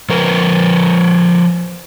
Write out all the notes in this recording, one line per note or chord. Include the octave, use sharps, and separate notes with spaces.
F3 A#4 B4